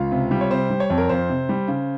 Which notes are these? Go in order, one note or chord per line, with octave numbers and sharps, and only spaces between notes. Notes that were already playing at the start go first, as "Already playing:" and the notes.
Already playing: C#2 F4
C3
G3
C#5
C3 C5
G3
C#5
F2
A#4
F2 C5
C3
G3
C#3